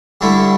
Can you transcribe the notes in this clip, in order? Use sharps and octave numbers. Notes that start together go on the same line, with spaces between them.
G2 D3 A3 E4